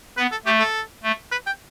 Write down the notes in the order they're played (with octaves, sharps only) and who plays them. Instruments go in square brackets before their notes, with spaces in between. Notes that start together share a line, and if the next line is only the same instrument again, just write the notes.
[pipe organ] B3 [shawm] B4
[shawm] A4
[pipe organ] A3 [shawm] G4
[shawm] A4
[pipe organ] A3
[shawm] B4
G5